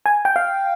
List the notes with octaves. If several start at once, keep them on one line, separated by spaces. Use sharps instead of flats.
G#5
G5
F5